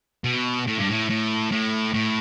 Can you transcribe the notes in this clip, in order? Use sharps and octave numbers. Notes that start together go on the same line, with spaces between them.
B2
A2
G2
A2
A2
A2
A2